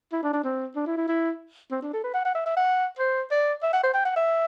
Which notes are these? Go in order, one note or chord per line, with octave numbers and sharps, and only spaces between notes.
E4
D4
D4
C4
D4
E4
E4
E4
C4
D4
A4
B4
F#5
F#5
E5
E5
F#5
C5
D5
E5
F#5
C5
G5
F#5
E5